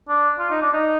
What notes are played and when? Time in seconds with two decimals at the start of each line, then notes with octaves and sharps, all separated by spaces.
0.09 D4
0.39 F4
0.50 D#4
0.62 D4
0.73 D#4